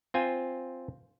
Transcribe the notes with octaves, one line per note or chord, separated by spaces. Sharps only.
C4 F4 C5 G#5